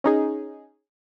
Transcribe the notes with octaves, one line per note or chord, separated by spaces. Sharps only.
C#4 D#4 G#4